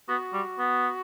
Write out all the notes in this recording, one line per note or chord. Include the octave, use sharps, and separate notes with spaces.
B3 F#4
G3
B3